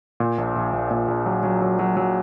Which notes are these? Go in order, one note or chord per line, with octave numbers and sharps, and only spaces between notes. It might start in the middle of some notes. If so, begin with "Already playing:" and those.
A#2
A#1
A#1
A#1
A#2
A#1
F#3
F#3
F#3
F#3
F#3